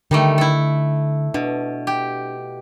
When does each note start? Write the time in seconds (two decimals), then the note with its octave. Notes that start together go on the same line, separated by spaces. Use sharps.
0.11 D3 D#3 G3 A3
0.38 E4 A4
1.34 B2 D4
1.87 G4